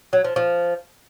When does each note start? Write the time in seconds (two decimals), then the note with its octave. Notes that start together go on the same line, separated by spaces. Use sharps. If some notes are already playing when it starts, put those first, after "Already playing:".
0.13 F#3
0.25 F3
0.36 F3